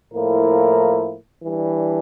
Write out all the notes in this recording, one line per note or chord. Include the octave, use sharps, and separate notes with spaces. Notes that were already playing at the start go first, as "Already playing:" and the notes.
A2 F3 A#3 E4 A#4
E3 G3 D4